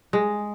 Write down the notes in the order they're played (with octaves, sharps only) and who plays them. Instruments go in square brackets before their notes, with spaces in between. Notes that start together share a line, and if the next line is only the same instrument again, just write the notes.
[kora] G#3